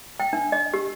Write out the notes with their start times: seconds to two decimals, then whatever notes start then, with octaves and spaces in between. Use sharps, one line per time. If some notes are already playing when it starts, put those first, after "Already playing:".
0.20 G5
0.33 D4
0.52 D#5
0.74 G4